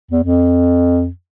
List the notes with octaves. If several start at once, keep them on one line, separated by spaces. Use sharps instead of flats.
E2
F2